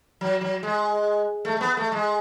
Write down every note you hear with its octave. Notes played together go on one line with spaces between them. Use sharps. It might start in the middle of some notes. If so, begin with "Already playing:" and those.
F#3
F#3
G#3
A3
A3
B3
A3
G#3